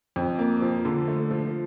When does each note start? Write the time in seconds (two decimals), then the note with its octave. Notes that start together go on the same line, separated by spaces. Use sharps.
0.16 F2
0.39 A#3
0.62 F3
0.85 D3
1.08 A3
1.31 F3